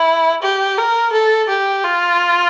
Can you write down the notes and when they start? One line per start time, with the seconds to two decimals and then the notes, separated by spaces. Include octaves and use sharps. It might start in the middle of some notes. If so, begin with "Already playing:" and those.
Already playing: E4
0.42 G4
0.77 A#4
1.12 A4
1.49 G4
1.83 F4